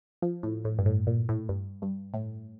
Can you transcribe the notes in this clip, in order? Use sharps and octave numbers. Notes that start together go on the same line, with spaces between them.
F3
A2
A2
G2
A2
A#2
A2
G2
G2
A2